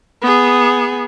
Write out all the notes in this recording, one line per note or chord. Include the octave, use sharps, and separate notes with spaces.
B3 G#4